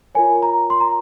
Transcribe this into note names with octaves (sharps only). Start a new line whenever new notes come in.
F4 A#4 C#5 G#5
A#5
C6
A#5